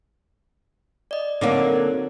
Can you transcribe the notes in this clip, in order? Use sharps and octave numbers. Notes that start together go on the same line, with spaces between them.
D5 D#5
D3 F#3 A#3 C4 D#4 D6